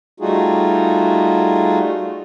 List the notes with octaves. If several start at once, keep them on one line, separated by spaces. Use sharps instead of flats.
G3 A3 D#4 F4 F#4 G#4